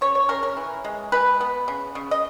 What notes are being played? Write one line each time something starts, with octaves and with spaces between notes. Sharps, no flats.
C#3 C#5
C#5
C#3 A#4
A#4
E3
G#3
G#3 B4
B3
C#3
C#3
D#5